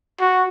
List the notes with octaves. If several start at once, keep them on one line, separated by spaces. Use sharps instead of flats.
F#4